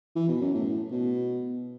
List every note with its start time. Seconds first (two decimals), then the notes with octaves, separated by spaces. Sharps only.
0.16 E3
0.28 B2
0.41 F#2
0.54 A2
0.91 B2